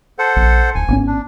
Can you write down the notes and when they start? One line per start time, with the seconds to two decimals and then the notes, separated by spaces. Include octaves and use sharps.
0.19 A4 C5 F#5
0.36 A#1
0.75 D1 G#5
0.88 G#1 B3 C#4
1.07 D4